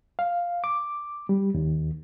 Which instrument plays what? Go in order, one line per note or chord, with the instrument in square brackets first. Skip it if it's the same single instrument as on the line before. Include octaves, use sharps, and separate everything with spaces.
[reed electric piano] F5
D6
G3
D#2